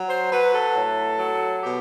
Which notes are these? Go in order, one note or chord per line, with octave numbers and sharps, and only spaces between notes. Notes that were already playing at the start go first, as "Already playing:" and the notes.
Already playing: F#3
C5
F#3 B4
A4
A2
F#3
B2 G4